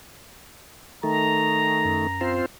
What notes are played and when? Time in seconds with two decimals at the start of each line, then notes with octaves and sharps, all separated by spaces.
1.03 D#3 A3 A#5
1.85 F#2
2.21 C4 F4 C5